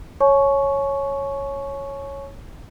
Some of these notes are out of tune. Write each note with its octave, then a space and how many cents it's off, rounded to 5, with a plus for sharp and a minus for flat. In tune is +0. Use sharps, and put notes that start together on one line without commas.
C#5 -5 G#5 +45 C#6 +0